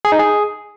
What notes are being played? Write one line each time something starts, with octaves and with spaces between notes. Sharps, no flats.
G#4
D#4
G#4